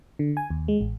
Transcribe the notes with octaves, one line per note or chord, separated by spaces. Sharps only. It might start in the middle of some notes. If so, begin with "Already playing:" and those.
D3
G#5
D#2
G#3
A1